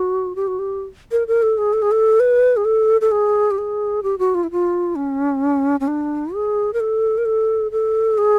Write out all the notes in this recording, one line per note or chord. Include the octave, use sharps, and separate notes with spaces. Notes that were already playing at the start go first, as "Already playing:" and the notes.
Already playing: F#4
G4
F#4
G4
A#4
A#4
A4
G#4
A4
G#4
A4
B4
G#4
A4
A4
G#4
G4
G#4
G4
F#4
F4
E4
F4
C#4
C#4
D4
G#4
A#4
A4
A#4
A4
A4
G#4